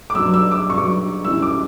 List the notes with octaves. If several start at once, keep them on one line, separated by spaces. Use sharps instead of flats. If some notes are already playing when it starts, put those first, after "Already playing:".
D6
G2 F#3 E6
E6
D6
G2 F#3 C#6
F#2 E3 G3 E6
D6